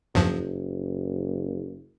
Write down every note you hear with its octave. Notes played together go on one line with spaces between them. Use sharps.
F#1 E2 G2 F3